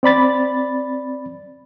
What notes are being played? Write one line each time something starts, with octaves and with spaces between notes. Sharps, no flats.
C4 D5 B5 A6